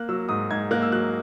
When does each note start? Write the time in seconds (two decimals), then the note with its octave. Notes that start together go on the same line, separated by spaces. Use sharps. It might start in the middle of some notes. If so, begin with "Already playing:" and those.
Already playing: A#3 F#6
0.09 F#3 E6
0.29 G#2 D#6
0.51 G#2 G#6
0.71 A#3 F#6
0.82 E6
0.92 F#3 F#6